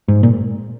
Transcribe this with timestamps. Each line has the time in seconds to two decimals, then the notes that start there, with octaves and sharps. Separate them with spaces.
0.08 G#2
0.23 A#2